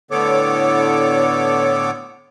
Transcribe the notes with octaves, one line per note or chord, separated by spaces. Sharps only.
A2 D3 B3 A4 C#5 D6